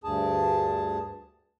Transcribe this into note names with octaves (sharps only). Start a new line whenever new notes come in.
D2 G2 G#4 A5